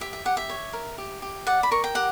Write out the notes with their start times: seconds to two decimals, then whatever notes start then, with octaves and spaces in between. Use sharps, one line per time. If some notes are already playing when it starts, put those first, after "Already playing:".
0.01 G4 E5
0.13 E5
0.25 G4 F#5
0.37 E5
0.50 C#5
0.73 A#4
0.98 G4
1.22 G4
1.47 D5 F#5
1.63 B5
1.71 A#4 C#6
1.84 G5
1.95 G4 F#5